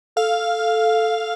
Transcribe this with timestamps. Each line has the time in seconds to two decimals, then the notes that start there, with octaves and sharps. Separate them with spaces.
0.16 A4 F5